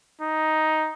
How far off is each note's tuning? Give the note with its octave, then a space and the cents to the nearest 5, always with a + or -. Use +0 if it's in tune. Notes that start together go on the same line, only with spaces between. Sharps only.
D#4 +5